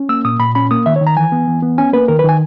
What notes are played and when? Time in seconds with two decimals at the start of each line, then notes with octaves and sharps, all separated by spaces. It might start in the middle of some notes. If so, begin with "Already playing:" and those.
Already playing: C#4
0.09 A#3 E6
0.25 A#2 D#6
0.39 A#2 B5
0.55 C#4 B5
0.71 A#3 D#6
0.86 D#3 E5
0.96 C#5
1.01 D#3
1.07 A#5
1.17 E3 G#5
1.32 B3
1.47 E3
1.62 B3
1.78 C#4 G#5
1.93 A#3 B4
2.08 D#3 A#4
2.19 B4
2.24 D#3 G#5